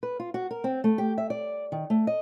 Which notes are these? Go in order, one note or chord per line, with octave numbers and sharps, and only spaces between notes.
B4
F4
F#4
A#4
C4
A3
G4
E5
D5
D#3
A3
D#5